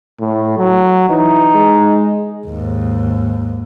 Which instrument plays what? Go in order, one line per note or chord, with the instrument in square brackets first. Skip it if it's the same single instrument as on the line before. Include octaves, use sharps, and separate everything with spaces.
[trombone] A2
F#3
[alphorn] E3 [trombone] D#4
[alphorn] G#3
[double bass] D#2 G#2